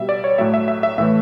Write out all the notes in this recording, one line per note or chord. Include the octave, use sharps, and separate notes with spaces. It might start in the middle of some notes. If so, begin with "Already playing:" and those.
Already playing: B2 G3 E5
D5
C#5
A2 F#3 A3 E5
E5
E5
E5
A2 E3 A3 E5